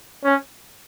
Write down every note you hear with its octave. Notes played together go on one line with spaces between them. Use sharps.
C#4